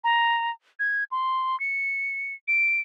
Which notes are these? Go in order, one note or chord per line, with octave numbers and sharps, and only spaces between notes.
A#5
G#6
C6
C#7
D7